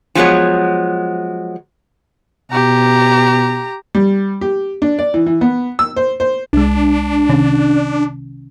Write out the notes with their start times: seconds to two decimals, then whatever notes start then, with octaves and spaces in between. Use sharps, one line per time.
0.15 F3 F#3 G#3 B3 C#5
2.51 B2 G4 A#5
3.95 G3
4.41 G4
4.82 D4
4.99 D5
5.14 E3
5.26 E3
5.41 B3
5.79 E6
5.96 C5
6.20 C5
6.53 C2 G#3 D4
7.29 C3 D#3 C#4